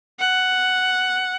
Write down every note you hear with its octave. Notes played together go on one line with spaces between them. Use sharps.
F#5